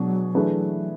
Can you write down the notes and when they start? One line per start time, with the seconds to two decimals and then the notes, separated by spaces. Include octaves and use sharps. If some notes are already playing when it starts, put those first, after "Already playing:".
Already playing: B2 F#3 G#3 D4 G#4
0.35 E3 A3 D4 G#4 B4